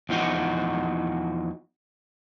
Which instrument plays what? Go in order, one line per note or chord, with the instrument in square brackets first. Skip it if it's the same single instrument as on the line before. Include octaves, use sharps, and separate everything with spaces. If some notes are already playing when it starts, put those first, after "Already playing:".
[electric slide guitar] E2 F3 F#3 D#4 F#4